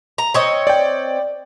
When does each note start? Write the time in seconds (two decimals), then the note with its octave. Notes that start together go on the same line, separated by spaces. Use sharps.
0.18 A#5
0.34 C4 C#5 D#5
0.67 D5 G5